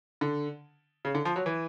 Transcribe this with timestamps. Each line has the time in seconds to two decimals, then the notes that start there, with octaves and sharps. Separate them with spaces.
0.21 D3
1.05 C#3
1.15 D3
1.25 F3
1.36 F#3
1.46 E3